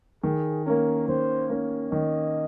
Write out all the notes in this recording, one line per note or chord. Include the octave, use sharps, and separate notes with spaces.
D#3 G#4
A#3 C#4 A#4
D#3 C5
A#3 C#4
D#3 D#5